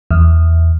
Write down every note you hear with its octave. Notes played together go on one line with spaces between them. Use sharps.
E2